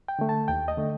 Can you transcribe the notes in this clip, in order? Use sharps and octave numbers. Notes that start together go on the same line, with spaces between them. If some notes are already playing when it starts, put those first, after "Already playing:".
G5
D3 A3
A5
D#2 G5
D#5
D3 A3